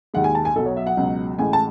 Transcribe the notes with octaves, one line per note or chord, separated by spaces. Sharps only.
D#2 D#3 G#3 F#5
G#5
A5
G#5
B1 B2 F#3 A4
C#5
E5
F#5
C#2 B2 F#3
A1 A2 G#3 G#5
A5